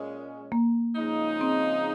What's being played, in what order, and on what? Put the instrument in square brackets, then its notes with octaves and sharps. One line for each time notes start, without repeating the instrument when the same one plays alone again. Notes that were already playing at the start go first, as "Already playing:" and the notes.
Already playing: [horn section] A#2 G#3 C#4
[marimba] A#3
[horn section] C#3 F3 G#3 D#4
[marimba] C4